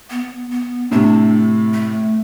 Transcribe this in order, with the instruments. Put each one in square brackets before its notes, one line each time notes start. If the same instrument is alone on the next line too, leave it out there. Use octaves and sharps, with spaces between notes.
[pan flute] B3
B3
[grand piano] A2 C3 [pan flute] D4
[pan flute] A3